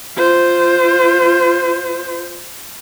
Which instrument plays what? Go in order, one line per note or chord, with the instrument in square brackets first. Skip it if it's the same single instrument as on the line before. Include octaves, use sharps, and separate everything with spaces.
[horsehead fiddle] F4 C5